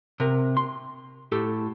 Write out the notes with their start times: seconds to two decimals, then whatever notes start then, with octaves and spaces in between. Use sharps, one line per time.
0.20 C3 A#4
0.57 C6
1.32 A2 G4 A4